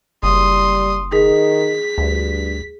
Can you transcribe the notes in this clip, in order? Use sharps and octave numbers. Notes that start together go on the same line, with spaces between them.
F#1 G3 C6 D#6
D#3 G#4 B6
D2 G2